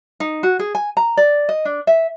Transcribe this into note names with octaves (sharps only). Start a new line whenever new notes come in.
D#4
F#4
G#4
G#5
A#5
D5
D#5
D4
E5